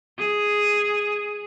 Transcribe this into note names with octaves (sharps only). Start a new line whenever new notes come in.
G#4